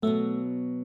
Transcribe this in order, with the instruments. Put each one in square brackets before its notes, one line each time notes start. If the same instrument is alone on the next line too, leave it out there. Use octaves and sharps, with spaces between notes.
[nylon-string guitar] B2 F#3 B3 [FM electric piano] A3